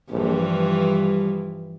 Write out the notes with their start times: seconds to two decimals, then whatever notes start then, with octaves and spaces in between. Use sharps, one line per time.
0.11 A#1 G2 E3 F3
0.49 G3